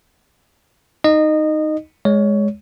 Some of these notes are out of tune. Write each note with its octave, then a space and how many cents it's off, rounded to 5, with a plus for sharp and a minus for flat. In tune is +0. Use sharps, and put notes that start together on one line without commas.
D#4 +0 D#5 -20
G#3 +0 C#5 +20